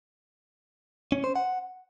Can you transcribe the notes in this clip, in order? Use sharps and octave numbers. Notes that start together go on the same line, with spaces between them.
C#4
C5
F#5